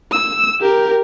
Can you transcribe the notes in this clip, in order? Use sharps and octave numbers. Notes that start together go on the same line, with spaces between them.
E6
G4 A#4